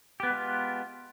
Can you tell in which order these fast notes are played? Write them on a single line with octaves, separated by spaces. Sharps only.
G4 B3 B4 G#3 F4